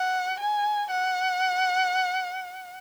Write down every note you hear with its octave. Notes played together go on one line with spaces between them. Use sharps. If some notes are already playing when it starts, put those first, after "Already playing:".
Already playing: F#5
G#5
F#5